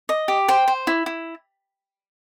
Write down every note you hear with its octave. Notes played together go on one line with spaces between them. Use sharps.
D#5
G4
C5 G5
C5
E4
E4